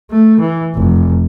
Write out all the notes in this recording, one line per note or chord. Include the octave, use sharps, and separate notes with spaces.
A3
E3
F1